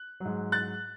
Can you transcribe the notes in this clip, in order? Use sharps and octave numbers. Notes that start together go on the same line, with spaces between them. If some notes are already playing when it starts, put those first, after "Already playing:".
Already playing: F#6
G#2 F#3
F#6 A6